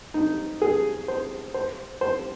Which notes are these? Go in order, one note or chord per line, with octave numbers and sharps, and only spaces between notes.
D#4
G#4
C5
C5
C5